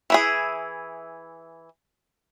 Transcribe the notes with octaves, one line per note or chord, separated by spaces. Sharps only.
E3 E4 G#4